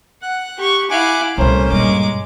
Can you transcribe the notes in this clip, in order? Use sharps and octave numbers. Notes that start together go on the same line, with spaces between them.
F#5 F#6
G4 C#6
E4 F5 F#5 G#5 D6
C2 A#2 A3 A#3 C#4 C5
G2 A#2 G#3 D6